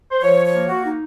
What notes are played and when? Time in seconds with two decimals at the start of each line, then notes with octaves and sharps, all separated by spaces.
0.11 C5
0.22 F3 C#5
0.45 C#5
0.53 A#3
0.69 F#4
0.86 D#4